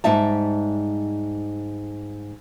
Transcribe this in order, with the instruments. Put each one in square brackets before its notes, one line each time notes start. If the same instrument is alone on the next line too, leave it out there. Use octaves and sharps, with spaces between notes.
[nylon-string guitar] G#2 G3 D#4 E5 A5